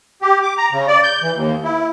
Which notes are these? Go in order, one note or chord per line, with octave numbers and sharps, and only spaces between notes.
G4
D6
A#5
C#3
D5
G6
E3
D#2
E4